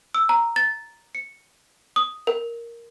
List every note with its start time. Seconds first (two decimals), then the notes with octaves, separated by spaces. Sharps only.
0.15 E6
0.29 A#5
0.56 A6
1.15 C#7
1.96 D#6
2.27 A#4